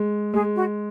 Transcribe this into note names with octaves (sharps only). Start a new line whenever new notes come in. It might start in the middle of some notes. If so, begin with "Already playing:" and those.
Already playing: G#3
G#3 G#4
F#4